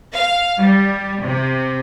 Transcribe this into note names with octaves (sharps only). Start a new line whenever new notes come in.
F5
G3
C3